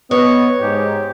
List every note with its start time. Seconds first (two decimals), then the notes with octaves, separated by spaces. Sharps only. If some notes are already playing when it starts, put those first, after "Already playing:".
0.11 B3 C#5 D#5
0.61 G#2 G4